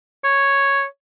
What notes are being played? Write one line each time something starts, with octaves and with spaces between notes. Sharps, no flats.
C#5